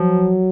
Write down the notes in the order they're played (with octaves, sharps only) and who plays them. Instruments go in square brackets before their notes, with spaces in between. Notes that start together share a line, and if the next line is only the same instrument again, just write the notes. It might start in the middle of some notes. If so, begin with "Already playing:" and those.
Already playing: [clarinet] F3 [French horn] F#3